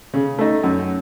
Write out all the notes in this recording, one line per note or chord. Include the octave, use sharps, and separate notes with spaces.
C#3
A3 D#4
F#2